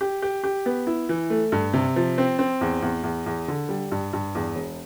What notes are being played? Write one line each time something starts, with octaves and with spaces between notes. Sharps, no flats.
G4
G4
G4
B3
E4
E3
A3
G2
C3
F3
C4
C4
E2
E2
E2
E2
D3
G3
G2
G2
E2
E1